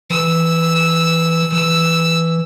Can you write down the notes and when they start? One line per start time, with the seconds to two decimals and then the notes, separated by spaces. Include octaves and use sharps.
0.10 E3 E6
1.52 E3 E6